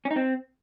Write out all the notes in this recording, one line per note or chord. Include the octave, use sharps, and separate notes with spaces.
C#4
D#4
C4